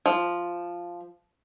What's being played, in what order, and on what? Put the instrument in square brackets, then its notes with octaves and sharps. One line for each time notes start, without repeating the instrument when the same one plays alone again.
[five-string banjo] F3